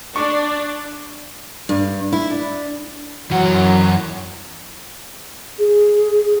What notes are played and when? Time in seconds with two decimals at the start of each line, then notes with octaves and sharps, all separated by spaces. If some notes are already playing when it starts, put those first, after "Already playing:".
0.16 D4 C#6
1.69 G2
2.13 E4
2.30 D4
3.31 F#2 E3 F#3 F#4 F#5
5.59 G#4